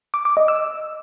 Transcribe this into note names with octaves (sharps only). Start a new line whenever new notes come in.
D6
D6
D#5
E6